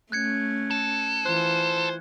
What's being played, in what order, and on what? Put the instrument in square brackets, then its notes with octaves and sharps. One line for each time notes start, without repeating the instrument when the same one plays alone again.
[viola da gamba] A3 C#4 [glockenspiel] F#6 G#6 C#7
[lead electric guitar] A4
[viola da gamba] E3 F4 [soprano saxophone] C5 [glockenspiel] F#6